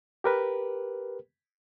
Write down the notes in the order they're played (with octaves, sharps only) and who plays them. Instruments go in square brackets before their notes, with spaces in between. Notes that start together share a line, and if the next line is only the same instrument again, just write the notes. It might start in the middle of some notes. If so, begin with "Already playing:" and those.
[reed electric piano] G4 A#4 B4